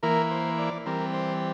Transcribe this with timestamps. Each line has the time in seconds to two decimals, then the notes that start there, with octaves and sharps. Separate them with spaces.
0.03 E3 A#3 E4 A#4
0.31 C5
0.58 D5
0.86 E3 G3 C4 A#4
1.14 C5